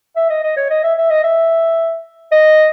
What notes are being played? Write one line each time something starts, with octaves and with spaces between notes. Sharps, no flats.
E5
D#5
D#5
C#5
D#5
E5
E5
D#5
E5
D#5